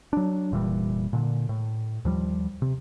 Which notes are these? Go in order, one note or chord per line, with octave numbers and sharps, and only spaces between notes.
F#3 D4
F1 A#2 E3 G3
A#2 D3
A2
D#2 F3 G3
C3